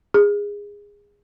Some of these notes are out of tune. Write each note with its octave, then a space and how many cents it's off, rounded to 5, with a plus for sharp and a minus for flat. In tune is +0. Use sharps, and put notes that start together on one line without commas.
G#4 -20